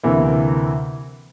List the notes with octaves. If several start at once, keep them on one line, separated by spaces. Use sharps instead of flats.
D2 C3 E3 A#3 E4